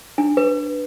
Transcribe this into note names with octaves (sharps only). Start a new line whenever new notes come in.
D4
B4